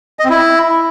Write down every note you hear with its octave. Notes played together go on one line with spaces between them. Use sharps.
D#5
C4
E4